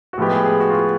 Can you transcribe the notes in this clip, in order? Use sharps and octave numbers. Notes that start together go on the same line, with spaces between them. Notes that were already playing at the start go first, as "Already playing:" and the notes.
F#4
A2 F3 G#3 B3 G4
G#4
G#4
F#4
F4
F#4